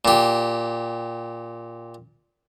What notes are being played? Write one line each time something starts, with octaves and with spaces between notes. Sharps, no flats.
A#2 G4